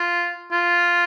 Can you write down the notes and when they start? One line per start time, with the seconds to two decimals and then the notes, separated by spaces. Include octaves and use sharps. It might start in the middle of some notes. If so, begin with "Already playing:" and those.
Already playing: F4
0.52 F4